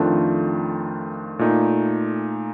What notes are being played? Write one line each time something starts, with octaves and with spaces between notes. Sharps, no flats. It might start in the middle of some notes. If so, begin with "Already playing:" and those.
Already playing: F2 D#3 A3 D4 F4
A#2 A3 D#4